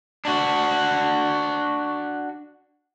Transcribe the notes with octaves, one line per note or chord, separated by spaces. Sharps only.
D4 F#4